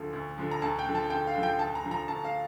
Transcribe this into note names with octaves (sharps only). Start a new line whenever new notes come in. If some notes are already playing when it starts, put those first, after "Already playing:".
Already playing: D2 D3 F3
D2
D3 F3
A#5
D2 A5
G5
D3 F3
A5
D2 G5
F5
D3 F3
G5
D2 A5
A#5
D3 F3
A#5
D2 A5
F5